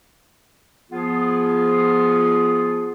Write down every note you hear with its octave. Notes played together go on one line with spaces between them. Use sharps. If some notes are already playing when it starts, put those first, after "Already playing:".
F3 B3 F4 G#4